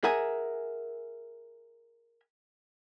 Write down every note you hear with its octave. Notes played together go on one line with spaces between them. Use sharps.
G#4 A#4 E5 F#5 G#5